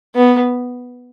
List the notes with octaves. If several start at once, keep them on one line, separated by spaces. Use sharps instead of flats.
B3